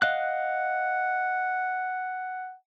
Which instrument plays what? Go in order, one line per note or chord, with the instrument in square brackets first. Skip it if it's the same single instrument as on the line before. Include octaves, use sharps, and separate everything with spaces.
[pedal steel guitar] D#5 F5 F#6 [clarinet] F#5